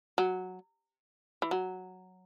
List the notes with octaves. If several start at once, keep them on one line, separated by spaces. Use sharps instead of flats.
F#3
E3
F#3